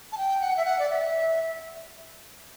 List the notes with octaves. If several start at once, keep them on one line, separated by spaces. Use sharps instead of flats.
A5
G5
F#5
E5
F#5
D5
E5